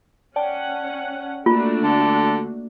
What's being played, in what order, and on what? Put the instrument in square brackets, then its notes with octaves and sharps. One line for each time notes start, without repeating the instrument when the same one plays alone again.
[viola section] C#4 F#5 [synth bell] D5 G5 A5
[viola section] A3 D4 F#4 [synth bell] A#3 [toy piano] F4
[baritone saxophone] D3